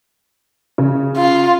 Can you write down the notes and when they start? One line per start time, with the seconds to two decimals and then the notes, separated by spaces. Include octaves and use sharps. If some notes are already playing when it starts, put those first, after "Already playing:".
0.78 C#3
1.17 F4